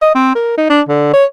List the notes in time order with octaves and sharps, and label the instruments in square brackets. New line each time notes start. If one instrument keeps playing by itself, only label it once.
[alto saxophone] D#5
C4
A#4
D#4
D4
D3
C#5